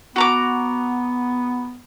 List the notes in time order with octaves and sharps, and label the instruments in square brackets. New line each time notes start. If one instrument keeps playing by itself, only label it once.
[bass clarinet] B3 [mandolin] F#4 A#5 D6